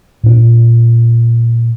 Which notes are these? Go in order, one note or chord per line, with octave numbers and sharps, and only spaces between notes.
A#2 D4